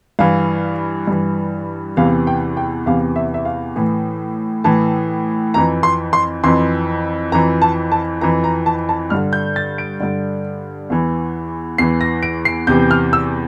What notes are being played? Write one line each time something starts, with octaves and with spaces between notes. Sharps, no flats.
G2 E3 F5
G2 E3
E2 C3 E3 F5
G5
G5
E2 C3 E3 F5
E5
E5
F5
A2 E3
A2 E3 A5
F2 E3 A#5
C6
C6
F2 E3 C6
F2 E3 A#5
A5
A5
F2 E3 A#5
A#5
A5
A5
G2 D3 F6
G6
A6
D7
G2 D3
E2 E3
E2 E3 C7
A#6
D7
C7
E2 C3 E3 G6
F6
E6